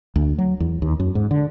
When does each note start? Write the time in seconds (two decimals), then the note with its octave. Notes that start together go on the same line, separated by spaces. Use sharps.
0.16 D2
0.38 F#3
0.60 E2
0.82 D#2
1.00 F#2
1.15 G#2
1.31 D3